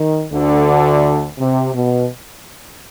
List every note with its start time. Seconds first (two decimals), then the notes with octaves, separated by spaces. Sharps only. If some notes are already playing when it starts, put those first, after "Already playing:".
Already playing: D#3
0.32 D2 D3
1.38 C3
1.73 B2